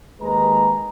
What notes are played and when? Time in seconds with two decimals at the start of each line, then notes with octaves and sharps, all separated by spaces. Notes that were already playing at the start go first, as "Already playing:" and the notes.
0.20 D#2 G#3 B4 A#5